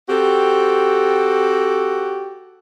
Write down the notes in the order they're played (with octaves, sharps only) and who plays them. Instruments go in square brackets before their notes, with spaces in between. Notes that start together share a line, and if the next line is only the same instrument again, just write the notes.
[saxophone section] C4 F#4 G4 A4